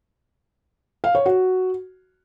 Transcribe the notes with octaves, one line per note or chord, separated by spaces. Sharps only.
F5
C#5
F#4